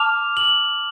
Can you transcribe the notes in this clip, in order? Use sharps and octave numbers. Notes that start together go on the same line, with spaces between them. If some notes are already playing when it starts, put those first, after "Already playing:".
Already playing: A5 D6 F6 F7
F#7